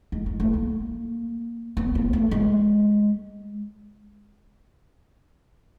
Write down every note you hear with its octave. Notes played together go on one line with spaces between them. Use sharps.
G#3
G#3
A3
A#3
B3
A#3
A3
G#3